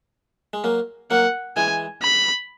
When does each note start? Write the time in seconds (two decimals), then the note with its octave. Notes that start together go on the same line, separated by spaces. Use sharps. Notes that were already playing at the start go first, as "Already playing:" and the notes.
0.53 G#3
0.64 F#3 A#3
1.11 F#3 A#3 F#5
1.57 E3 G#3 G#5
2.03 B5